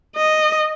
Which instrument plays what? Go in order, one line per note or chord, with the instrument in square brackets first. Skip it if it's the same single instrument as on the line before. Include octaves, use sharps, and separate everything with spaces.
[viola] D#5